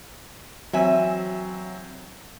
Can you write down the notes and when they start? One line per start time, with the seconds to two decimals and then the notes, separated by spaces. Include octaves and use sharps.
0.73 E3 F#3 C4 E5 G#5